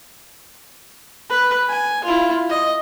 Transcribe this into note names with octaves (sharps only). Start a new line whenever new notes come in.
B4
G#5
E4 F4
D#5